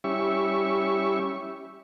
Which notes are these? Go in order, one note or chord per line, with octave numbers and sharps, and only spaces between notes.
G3 C#4 E4 G4 E5 C#6